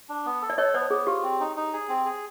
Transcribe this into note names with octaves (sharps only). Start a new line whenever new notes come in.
D4
B3
A4
D5
A4 C#5 D#5
B3 C5 D5
B3 G#4
F4 G4
C4
D#4
D#4
G#4
C4
G#4